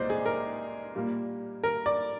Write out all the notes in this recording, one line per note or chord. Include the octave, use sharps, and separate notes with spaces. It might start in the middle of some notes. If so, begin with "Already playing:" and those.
Already playing: C2 A#2 G#3 C5 D5 D#5
G#4
A#4
A#2 G3 A#3
A#4
D5